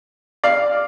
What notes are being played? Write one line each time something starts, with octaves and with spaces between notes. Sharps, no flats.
D5 F5